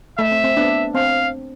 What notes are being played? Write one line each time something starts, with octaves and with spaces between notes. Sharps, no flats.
A3 E5
C4
C4
B3 D4
C4 F5